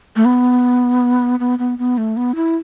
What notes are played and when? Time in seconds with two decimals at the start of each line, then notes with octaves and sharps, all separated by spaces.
0.16 A3
0.25 B3
1.40 B3
1.59 B3
1.79 B3
1.98 A3
2.17 B3
2.35 E4